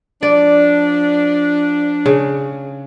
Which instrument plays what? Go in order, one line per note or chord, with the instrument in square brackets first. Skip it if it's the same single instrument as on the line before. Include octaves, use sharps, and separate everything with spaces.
[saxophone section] F3 D4 [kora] D5
[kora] C#3